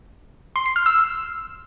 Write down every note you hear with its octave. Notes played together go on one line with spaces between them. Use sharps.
C6
C7
F6
E6